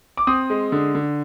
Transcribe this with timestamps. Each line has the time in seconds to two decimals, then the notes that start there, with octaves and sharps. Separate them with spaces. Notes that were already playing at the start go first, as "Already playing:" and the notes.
0.17 D6
0.27 C4 D#6
0.50 G#3
0.72 D3
0.95 D3